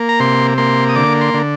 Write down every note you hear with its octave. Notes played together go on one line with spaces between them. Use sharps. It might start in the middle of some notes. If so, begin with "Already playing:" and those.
Already playing: A#3
A#5
C3 C6
A#3 C6
D#6
D3 D6
C6
D3